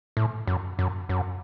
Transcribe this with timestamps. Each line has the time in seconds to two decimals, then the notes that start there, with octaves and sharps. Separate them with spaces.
0.17 A2
0.47 F#2
0.79 F#2
1.09 F#2